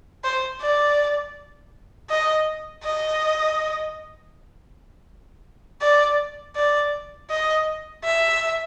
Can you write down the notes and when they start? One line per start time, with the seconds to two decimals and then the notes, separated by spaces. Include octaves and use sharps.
0.24 C5
0.61 D5
2.10 D#5
2.84 D#5
5.81 D5
6.56 D5
7.30 D#5
8.04 E5